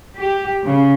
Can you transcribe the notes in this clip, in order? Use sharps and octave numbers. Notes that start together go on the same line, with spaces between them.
G4
C#3